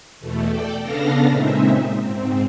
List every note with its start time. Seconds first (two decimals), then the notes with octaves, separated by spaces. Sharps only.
0.20 E2 B2 A3
0.49 A4 D5 G5
0.81 C#3 B3 D4 A4 F5 A#6
1.28 A#2 C#3 G#3 C4 D#4 E5
2.01 G#2 C4